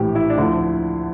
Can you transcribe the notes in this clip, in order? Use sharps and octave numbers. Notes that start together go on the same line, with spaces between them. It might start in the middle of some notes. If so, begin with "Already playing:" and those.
Already playing: A#1 A2 E3 G4
E4
D4
D2 D3 F3 E4